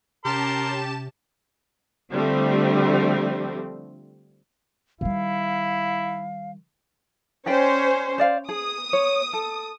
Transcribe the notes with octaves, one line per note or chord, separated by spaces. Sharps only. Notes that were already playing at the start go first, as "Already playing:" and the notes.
C3 C#4 G4 A#4 A5 C6 E7
D3 F3 G3 A3 C4
D#3 G3 E4 F5
C#4 G4 C5 D5 G5
C5 D5 F5
G#4 D#6
C#5
A4